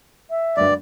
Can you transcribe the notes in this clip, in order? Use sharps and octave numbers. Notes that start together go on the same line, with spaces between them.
E5
D2 G2 B4 D5